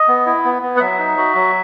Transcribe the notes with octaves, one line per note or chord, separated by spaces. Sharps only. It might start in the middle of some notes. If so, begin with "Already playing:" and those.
Already playing: D#5
B3
E4
B3
B3
F#5
F#3 E5
D#4
F#4
F#3